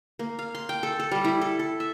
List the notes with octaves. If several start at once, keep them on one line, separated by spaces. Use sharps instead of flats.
A#3
F5
C6
G5
A4
A4
G3
E4
A4
A4
E5